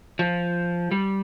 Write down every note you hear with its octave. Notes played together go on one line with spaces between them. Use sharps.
F3
G3